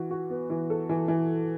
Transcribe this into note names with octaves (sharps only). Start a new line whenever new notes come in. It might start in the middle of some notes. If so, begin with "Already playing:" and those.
Already playing: E3 F#4
F#4
B3
E3
A4
E3
E3